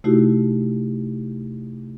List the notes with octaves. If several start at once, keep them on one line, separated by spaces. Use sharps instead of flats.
C3 A3 D#4 E4 F#4 G4